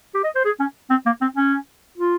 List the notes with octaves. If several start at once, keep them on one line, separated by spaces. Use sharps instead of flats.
G4
D#5
C5
G#4
C#4
C4
A#3
C4
C#4
F4